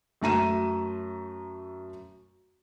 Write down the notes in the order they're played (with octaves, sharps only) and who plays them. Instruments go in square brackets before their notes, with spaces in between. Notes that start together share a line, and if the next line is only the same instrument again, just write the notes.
[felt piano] F#2 A3 A#5 D#7 E7